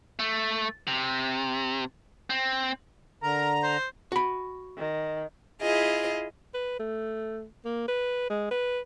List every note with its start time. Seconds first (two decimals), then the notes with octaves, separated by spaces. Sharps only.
0.19 A3
0.87 C3
2.30 C4
3.23 D3 A#4 A#5
3.63 C5
4.12 F#4 B5
4.77 D#3
5.61 E4 F4 G#4 D#5
6.54 B4
6.80 A3
7.65 A#3
7.88 B4
8.30 G#3
8.51 B4